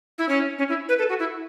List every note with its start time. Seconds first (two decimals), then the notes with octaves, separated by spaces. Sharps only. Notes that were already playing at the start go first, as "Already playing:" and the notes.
0.18 E4
0.29 C#4
0.59 C#4
0.69 E4
0.89 B4
0.99 A4
1.09 F#4
1.19 E4